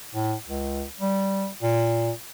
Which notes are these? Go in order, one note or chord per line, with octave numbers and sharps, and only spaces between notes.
A2
C#2
G3
A#2